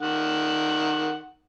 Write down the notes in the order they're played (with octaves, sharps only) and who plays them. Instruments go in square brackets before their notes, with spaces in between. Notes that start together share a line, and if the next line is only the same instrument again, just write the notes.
[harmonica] D#3 F#5